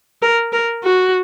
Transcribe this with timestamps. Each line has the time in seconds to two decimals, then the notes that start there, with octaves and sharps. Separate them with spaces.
0.22 A#4
0.52 A#4
0.84 F#4